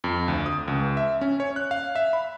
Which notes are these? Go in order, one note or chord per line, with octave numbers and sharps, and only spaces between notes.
F2
D2
D#6
C#2
E5
C#4
C#5
F#6
F5
E5
B5